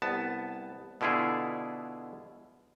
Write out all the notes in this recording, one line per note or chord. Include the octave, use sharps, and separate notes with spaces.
C2 B3 A5
B2 D3 E4 F4 G#4